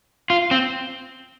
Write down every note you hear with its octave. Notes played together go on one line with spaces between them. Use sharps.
F4
C4